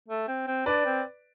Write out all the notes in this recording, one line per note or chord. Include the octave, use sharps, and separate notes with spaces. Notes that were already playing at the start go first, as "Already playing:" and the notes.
A3
C4
C4
D4 B4 D5
C4